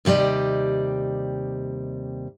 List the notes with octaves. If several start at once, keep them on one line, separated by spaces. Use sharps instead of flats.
D#2 C3 G3 D5 D#5